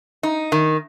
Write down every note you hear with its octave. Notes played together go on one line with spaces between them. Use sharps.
D#4
D#3